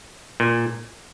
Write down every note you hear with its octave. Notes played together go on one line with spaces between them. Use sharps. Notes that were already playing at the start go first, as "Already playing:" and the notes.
A#2